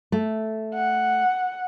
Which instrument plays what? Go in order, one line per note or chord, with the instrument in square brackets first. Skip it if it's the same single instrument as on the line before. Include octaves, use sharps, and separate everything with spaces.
[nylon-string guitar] A3
[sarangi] F#5